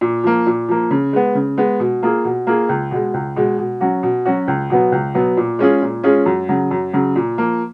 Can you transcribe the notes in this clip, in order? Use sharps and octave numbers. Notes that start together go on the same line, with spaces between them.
A#2
F3 A#3
A#2
F3 A#3
C#3
G#3 B3
C#3
G#3 B3
B2
A#3 F4 G#4
B2
A#3 F4 G#4
C#2
B2 G#3
C#2
B2 G#3
B2
F#3 C#4 F#4
B2
F#3 C#4 F#4
C#2
B2 F#3 B3
C#2
B2 F#3 B3
A#2
G#3 C#4 F4 G#4
A#2
G#3 C#4 F4 G#4
F#2
C#3 F#3
F#2
C#3 F#3
A#2
F3 A#3